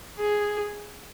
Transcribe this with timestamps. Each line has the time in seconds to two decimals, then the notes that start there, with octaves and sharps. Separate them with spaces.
0.19 G#4